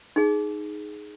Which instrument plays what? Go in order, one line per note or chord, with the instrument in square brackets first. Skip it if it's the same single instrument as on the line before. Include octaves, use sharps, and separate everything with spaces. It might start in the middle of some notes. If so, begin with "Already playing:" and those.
[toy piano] D#4 G#4